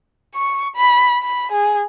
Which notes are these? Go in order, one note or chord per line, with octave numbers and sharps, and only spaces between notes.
C#6
B5
B5
G#4